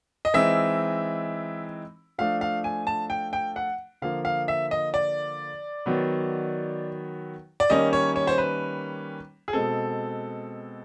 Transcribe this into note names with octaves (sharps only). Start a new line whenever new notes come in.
D#5
E3 G#3 C4 D#4 E5
F3 A3 D4 F5
F5
G#5
A5
G5
G5
F#5
D3 F3 A#3 F5
F5
E5
D#5
D5
D#3 F#3 B3
D5
D#3 G3 A#3 C#4 D#5
C#5
C#5
C5
B4
G#4
B2 G#3 C4 A4